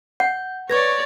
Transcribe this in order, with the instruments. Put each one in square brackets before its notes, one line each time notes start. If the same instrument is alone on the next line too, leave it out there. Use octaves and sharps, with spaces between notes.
[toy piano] F#5 [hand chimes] G6
[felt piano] B4 [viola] C#5 D5 [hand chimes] C#6 G#6 A#6